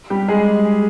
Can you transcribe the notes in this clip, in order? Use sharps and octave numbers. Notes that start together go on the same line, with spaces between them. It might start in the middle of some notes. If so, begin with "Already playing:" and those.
G3 G4
G#3 G#4